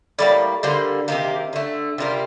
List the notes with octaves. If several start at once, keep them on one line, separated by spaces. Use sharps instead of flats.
A2 G3 A#3 D5
D3 G3 A#3 C5
C3 D#3 A#3 G4
D3 A3
C3 G3 A#3 F4